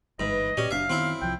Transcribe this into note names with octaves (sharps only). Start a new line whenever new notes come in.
G1 G#2 E3 B4 D#5
A#2 C#4 G4 C#5 D5
F#1 F#2 C#4 D4 E5 F5
D#3 B3 C4 E4
C2 F3 G5